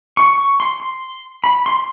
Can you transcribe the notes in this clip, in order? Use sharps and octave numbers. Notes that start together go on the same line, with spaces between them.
C#6
C#6
C6
C6
B5
C6